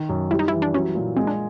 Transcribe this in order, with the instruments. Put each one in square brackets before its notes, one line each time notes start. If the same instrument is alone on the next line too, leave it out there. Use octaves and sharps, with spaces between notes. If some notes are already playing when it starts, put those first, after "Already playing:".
Already playing: [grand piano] D#3
F#2
[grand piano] G3 [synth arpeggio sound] E4
[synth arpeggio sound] D#4
[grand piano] E3 [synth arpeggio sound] E4
[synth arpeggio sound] D4
[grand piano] F#3 [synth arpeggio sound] C#4
[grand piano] A#2
[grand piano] G#3 [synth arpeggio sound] C4
[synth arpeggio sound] D4